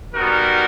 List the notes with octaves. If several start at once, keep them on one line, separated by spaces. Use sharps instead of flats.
G3 B3 D#4 F#4 A#4